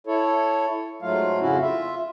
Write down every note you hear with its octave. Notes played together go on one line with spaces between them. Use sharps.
E4 A4 C#5
G#2 F#3 A3 F4 F5
F2 C#3 C#4 E4 F#4
F4 E5